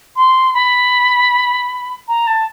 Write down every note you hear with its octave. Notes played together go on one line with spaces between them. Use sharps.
C6
B5
A#5
A5